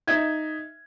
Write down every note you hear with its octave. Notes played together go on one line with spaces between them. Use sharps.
D#4 E5 G#6